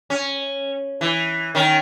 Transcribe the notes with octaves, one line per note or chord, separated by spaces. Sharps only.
C#4
E3
D#3 C#4